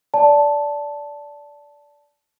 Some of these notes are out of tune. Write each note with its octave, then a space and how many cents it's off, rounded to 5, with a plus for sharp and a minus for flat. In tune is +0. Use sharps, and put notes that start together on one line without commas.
D5 -15 A5 +0